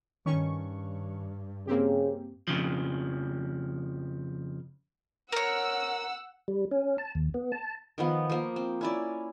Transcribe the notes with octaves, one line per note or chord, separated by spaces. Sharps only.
G2 D#3 C#4 C#6
C#3 A#3 C4 G4
F2 C#3 F3
A#4 C#5 F#5 E6
G3
C#4
A5
D#2
B3
A5
D#3 F3 B3
F3 A#3
C4
C#4 E4 D5